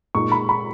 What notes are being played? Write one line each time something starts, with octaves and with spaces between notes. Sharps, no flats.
A#2 G#3 D#4 C#6
B5
B5